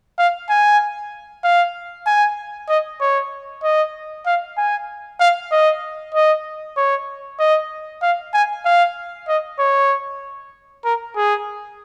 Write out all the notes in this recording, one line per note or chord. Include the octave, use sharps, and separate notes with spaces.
F5
G#5
F5
G#5
D#5
C#5
D#5
F5
G#5
F5
D#5
D#5
C#5
D#5
F5
G#5
F5
D#5
C#5
A#4
G#4